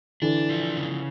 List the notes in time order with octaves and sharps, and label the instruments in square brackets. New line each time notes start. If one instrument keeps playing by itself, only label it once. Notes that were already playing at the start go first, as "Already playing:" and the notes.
[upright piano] D3 E3 [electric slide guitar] D4
[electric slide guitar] F3
C#3